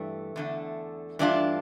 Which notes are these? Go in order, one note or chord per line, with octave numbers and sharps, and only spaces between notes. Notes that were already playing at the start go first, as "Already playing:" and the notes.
Already playing: G2 E3 A3
E2 D3 A3
G2 E3 A3 D4 F4